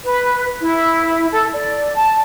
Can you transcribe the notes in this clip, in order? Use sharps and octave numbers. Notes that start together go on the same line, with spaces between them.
B4
E4
A4
D5
A5